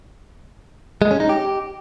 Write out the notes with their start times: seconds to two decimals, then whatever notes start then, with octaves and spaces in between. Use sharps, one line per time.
1.02 G#3
1.11 C#4
1.20 D#4
1.29 G4